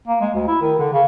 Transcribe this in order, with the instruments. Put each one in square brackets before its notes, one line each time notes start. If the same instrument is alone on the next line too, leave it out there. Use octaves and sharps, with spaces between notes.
[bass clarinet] A#3
G#3
D2
E4
D#3
D3
C#3